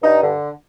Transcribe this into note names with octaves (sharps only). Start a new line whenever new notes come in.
G2 D#4
D3